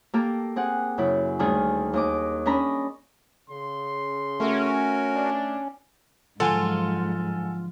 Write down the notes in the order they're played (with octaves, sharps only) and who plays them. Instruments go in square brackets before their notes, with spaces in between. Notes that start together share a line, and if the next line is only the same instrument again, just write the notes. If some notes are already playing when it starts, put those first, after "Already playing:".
[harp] A#3 G4 A4 A#5
C4 G#4 F#5
F#2 C#3 E4
D2 D3 D#3 G3 G#4
D#2 D#5 D6
C#4 D4 D#5 A#5 B5
[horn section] C#3 C6
[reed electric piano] A3 E5 [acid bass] C#4 [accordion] F#4 A#4
[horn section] D4
[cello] G#2 [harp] D3 F3 F#3 [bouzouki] F4 [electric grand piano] A4 F#5 G#5